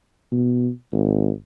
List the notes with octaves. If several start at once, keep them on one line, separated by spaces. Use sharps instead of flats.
B2
G#1